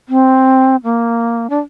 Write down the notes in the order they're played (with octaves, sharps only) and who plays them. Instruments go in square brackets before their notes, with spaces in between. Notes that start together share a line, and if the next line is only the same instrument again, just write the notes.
[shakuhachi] C4
A#3
D4